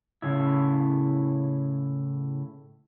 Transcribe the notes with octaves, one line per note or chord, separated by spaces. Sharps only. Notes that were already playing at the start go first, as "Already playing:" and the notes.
A2 C#3 E4